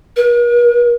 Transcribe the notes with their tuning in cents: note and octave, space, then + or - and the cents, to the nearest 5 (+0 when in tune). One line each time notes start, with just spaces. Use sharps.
A#4 +45